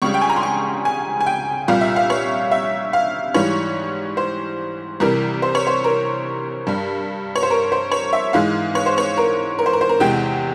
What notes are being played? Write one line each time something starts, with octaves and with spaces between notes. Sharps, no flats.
C#2 C#3 G3 C#6
G5
G#5
A#5
C6
C#6
G#5
G#5
G5
C2 A#2 G3 F5
E5
F5
C#5
E5
F5
G#2 E3 G3 C#5
C5
C2 C3 E3 G3 A#4
C5
C#5
C5
A#4
G2 G3
C#5
C5
A#4
C5
C#5
E5
G#2 E3 G#3 F5
C#5
C5
C#5
A#4
A#4
C5
A#4
C5
A#4
E2 C3 E3 G#3 G5